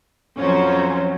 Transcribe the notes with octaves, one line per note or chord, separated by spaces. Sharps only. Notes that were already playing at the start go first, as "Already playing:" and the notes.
F2 F#3 C#4 C5